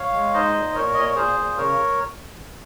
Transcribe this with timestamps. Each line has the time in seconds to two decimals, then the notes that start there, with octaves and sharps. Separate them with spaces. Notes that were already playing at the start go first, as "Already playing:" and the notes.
Already playing: C#5 F5
0.14 G#3
0.34 D#4 C5 D#5
0.55 A#2
0.74 A#2 A#4 C#5
0.94 A#2 D#5
1.05 C#5
1.15 A#2 G#4 C5
1.36 A#2
1.57 C#3 A#4 C#5